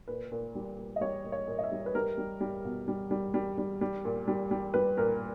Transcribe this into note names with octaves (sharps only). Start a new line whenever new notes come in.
A#2 B4
A#2
G3
A#2
D#5
G3 C#5
A#2
C#5
A#2
D#5
E5
G3
B4
G3 A#4
G3
G3
B2
G3
G3
G3
G3
G3
A#2
G3
G3
G3 B4
A#2 A#4